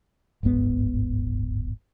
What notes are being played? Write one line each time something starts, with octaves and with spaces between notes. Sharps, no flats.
D1 G1 G#2 B3